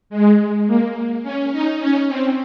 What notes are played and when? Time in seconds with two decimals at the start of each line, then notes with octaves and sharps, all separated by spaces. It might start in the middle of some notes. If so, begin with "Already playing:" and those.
0.10 G#3
0.67 A#3
1.23 C#4
1.52 D#4
1.80 C#4
2.08 C4